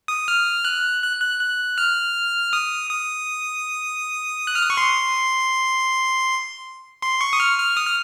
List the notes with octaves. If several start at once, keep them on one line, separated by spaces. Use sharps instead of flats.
D#6
F6
F#6
F#6
F#6
F#6
F6
D#6
D#6
F#6
F6
D#6
C#6
C6
C6
C#6
D#6
F6
F6
D#6
F6